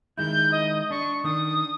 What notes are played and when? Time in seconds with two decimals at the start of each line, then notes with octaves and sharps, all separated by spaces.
0.18 D#3 G#3 E4 G6
0.52 D#5
0.91 D4 C#6
1.24 D#3 D4 D#6